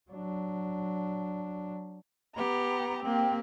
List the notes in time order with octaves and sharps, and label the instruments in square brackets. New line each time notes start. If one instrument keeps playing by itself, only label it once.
[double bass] F#3 D4
[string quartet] B3 G4 [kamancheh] A#5
[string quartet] A#3 [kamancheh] C4 G4